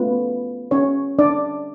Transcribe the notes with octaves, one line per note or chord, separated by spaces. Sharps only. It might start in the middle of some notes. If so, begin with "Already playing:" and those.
Already playing: A3 B3 C#4 F4 B4
C#4 C#5
D4 D5